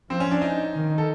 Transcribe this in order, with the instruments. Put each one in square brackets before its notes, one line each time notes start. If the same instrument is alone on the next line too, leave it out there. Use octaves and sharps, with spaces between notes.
[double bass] F3 [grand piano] C4
[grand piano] C#4
D4
D#4
[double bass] D#3
[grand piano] A4